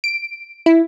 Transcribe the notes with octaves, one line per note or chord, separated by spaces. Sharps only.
D7
E4